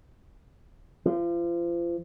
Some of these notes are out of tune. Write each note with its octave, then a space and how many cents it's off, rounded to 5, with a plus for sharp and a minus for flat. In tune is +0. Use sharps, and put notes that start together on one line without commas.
F3 -35